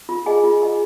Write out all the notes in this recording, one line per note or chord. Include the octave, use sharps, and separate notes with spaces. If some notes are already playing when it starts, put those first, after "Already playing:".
F4
G#4 D#5 G#5
F4
G#4 D#5 G#5